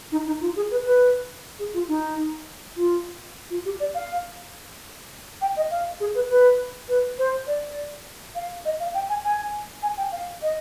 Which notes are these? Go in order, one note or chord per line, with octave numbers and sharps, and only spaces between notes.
D#4
D#4
F4
G#4
B4
B4
G#4
F4
D#4
F4
F4
G4
D5
F5
G5
D#5
F5
G#4
B4
B4
B4
C5
D5
F5
D#5
F5
G5
G#5
G#5
G#5
G5
F5
D#5